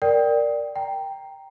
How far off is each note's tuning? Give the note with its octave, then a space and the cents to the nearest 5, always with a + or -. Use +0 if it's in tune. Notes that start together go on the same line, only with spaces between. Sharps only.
A#4 +0 D5 +0 G5 +0
G5 +0 A#5 +0